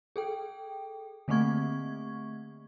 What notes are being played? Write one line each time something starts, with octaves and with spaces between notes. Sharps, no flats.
G#4 A4 G5
D3 A3 A#3 C4 C#6 G#6